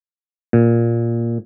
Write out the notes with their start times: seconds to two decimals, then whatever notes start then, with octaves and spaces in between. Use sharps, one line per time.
0.53 A#2